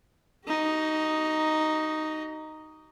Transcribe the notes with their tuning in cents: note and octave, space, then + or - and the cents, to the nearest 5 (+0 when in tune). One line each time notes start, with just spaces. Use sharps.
D#4 +0 F#4 +40